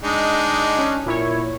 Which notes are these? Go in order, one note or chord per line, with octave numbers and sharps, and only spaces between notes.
G#3 D4 D#4
C#4
A#2 E4 C#5